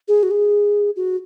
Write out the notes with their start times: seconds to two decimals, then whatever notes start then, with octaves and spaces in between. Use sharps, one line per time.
0.08 G#4
0.23 F#4
0.31 G#4
0.96 F#4